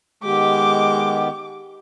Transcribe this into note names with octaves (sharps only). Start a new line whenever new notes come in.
D#3 G#3 B3 G4 D6